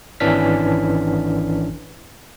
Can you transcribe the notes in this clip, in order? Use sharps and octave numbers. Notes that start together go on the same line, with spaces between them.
G#1 E3 C#4 D4 F6 B6